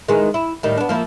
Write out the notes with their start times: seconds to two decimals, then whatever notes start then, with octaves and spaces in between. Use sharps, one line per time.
0.08 D#3 E3 G#3
0.34 E4
0.63 A2 D#3 G3
0.77 B3 D4
0.89 F3 A#3 E4